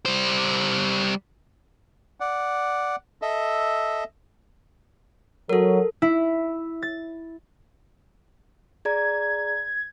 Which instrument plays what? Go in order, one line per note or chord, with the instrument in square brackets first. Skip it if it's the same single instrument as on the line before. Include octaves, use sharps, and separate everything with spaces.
[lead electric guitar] G3 C5
[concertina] D5 F#5
A4 D#5 E5
[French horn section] F#3 [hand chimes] A4 A#4
[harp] E4
A6
[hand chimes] G#4 D5 A#5 [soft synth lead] G#6